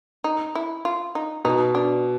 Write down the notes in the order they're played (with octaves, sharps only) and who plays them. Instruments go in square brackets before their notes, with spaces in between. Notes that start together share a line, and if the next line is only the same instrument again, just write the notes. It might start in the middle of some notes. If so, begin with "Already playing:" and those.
[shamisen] D#4
E4
F4
D#4
[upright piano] B2 [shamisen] D#4
[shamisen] D4